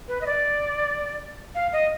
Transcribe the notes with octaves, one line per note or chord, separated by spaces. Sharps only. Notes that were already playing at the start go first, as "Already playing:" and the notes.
B4
D#5
D5
F5
D#5